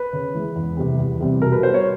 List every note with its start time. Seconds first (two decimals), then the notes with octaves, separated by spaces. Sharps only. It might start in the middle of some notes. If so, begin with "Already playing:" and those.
Already playing: B4
0.13 C#3
0.34 E3 G#3
0.56 E2
0.77 C3 E3 G3 C4
0.99 E2
1.20 C3 E3 G3 C4
1.42 B2 A#4
1.52 B4
1.63 G3 B3 D4 C5
1.74 C#5